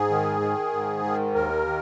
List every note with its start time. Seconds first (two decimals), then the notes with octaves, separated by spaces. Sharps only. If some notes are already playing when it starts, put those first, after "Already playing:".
Already playing: G#2 G#4
0.10 D#3
0.41 D#3
0.73 G#2
1.04 D#3
1.35 D#2 A#4
1.67 D#3